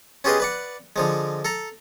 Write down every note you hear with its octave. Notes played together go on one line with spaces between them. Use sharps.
C#4 F4 G4 G#4 B4 D#5
B4 D5 F#5
D3 F3 G#3
A4 A#5